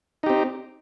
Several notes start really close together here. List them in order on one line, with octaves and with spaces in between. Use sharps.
D#4 G4 C4